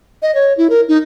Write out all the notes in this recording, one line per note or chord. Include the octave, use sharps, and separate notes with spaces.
D#5
C#5
E4
A#4
D#4